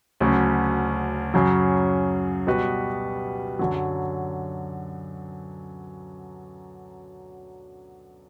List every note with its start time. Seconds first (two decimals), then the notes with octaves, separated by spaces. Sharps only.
0.20 D2 C#3 F#3 C#4
1.34 F#2 C#3 F#3
2.47 B2 G3 B3 F#4 B4
3.59 F#2 D3 F#3